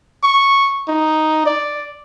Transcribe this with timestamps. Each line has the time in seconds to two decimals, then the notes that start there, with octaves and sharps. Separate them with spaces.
0.23 C#6
0.88 D#4
1.46 D5